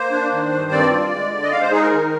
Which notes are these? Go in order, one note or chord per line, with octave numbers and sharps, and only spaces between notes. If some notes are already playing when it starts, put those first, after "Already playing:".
Already playing: A#3 C5
D4
D#3
G2
C4 D5
F4
G#3
D3
D#5
G#3 F5
C5
D#4 G#4
A#4
D#3